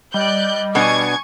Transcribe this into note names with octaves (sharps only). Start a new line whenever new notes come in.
G3 D5 D#5 F#6 G6
B2 B3 D4 G#5 C#6 G#6